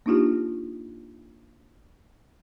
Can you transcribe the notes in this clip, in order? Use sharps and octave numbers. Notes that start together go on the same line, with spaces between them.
A#3 D4 D#4 F4 G4